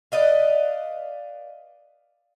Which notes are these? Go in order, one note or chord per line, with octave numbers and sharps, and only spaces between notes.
B4 D5 D#5 F5